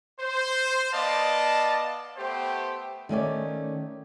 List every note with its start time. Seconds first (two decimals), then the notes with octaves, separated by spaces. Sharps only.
0.20 C5
0.93 B3 D5 D#5 F5 A5
2.18 A3 B3 G4 C5
3.09 D#3 A3 C#4 D5